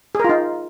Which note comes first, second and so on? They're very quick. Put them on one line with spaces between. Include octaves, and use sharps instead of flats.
G#4 A#4 F4 D#4